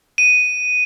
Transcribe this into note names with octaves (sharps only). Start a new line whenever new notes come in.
D#7